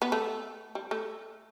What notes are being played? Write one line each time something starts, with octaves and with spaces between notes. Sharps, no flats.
B3
A3
G3
A3